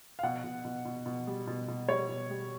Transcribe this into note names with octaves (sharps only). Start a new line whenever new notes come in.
F5
B2 F#5
B2
B2
B2
B2
G3
B2
B2
G3 C#5
B2
G3